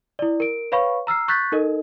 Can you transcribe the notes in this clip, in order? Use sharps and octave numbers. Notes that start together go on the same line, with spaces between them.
E4 D5
A#4 D7
B4 C#5 F5 B5 C#6
A#5 E6 F6 C7
C#6 F#6 G6 A6 B6
D#4 A4 A#4 D#5